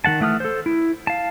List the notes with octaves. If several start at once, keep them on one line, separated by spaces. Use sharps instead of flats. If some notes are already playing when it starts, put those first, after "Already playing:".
D#3 A3 F#5 A5
E3 A3 F#5 D#6 F6
A4 C5
E4
F5 A5